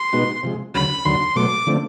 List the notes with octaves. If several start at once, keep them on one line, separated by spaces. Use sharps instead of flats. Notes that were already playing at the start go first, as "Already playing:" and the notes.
Already playing: C6
B2 G#3 B3 D#4 F#4
C3 F3 G#3
D2 C#3 F#3 B5
D#2 D3 F#3 C6
B2 F#3 A3 D6
D3 F3 A3 C4